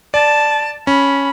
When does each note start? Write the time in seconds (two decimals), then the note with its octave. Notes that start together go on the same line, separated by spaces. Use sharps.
0.14 D5 A5
0.87 C#4 B5